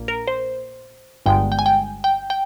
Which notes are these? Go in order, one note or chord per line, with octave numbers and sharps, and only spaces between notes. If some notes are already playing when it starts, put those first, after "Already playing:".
Already playing: A#1 A#2 A#3
A#4
C5
G1 G2 D3 G#3 G5
G5
G#5
G5
G5
G5